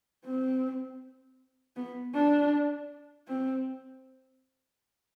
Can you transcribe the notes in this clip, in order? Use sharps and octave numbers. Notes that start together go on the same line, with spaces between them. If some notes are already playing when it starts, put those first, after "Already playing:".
C4
B3
D4
C4